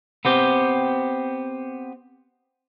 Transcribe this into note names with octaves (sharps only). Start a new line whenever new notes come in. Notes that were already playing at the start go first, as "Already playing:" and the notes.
B3 C4 G4